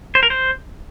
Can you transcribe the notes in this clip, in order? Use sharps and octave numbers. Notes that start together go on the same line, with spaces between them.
C5
A#4
C5